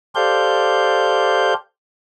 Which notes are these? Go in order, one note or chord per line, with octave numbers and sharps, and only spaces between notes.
G4 A4 C5 D5 F5 G6